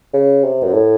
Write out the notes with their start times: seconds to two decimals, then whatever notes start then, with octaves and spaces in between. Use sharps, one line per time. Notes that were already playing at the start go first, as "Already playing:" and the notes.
0.14 C#3
0.44 C3
0.64 F#2
0.74 A2